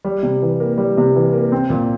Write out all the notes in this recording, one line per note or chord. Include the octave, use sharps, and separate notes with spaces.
G3
C3
E3
A#3
G3
C3
E3
A#3
C4
A#2